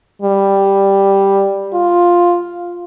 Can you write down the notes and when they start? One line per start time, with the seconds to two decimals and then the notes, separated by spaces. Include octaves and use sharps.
0.22 G3
1.73 F4